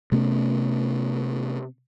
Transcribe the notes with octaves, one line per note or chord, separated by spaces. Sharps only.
C3 A3 B3 C#4